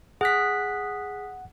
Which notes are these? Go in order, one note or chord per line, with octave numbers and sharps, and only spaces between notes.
G#4 F#5 F#6 B6